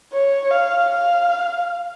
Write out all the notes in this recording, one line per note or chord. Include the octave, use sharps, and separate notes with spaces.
C#5
F5
F5